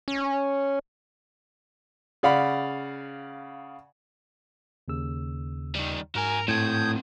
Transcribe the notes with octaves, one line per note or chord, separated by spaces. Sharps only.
C#4
C#3 D5 F5 F#5 B5
D#2 C#3 E6
D#3 G3
G#2 F#3 A#4 G#5 A#5
A2 A3 C4 D#6 G6 G#6